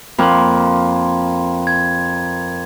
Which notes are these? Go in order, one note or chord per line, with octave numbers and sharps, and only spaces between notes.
F2 A#3 B5 C6
G#6